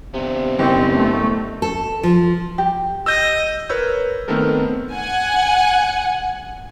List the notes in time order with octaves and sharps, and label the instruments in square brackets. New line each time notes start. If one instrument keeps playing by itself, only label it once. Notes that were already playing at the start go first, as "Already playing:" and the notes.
[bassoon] C3 [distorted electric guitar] B3 D4
[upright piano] F#1 [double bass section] C4 [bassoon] G4
[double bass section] A3
[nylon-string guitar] A4
F3
[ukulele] G4
[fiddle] D#5 [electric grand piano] E6 G6
[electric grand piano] A#4 B4 C#5 E6 G6
D#3 A3 B3 C4 A4 A#4
[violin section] F#5 G#5